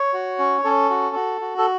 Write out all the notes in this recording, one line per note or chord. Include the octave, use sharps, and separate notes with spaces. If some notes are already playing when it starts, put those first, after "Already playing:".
Already playing: C#5
F#4
C#4
C#4 A4
F#4
F#4
F#4
A4